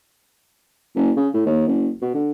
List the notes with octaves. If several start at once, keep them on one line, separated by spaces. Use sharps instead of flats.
F#1
C#3
A2
D#2
F#1
B2
D3